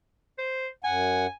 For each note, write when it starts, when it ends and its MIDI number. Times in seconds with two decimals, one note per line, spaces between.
0.38 0.68 72
0.84 1.27 42
0.84 1.27 78
0.84 1.31 80